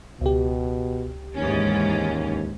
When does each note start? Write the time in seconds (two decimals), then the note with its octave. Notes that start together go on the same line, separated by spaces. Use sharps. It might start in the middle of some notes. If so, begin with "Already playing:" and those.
0.21 C#2 B2 G4
1.36 D#2 G#2 E3 C#4